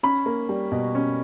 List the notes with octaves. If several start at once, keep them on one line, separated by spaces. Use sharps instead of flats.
C#4 B5
A#3
G3
B2
C#4